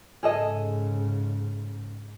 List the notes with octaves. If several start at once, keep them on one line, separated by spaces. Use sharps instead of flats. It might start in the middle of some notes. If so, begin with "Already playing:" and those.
G#2 C#3 G#4 A4 D#5